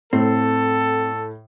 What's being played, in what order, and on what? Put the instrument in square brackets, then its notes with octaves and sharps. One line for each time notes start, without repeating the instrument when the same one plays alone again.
[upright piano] A2 [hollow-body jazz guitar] C4 [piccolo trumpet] A4